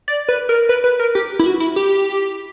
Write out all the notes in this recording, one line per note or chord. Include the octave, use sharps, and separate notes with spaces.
D5
B4
A#4
B4
B4
A#4
G4
E4
F#4
E4
G4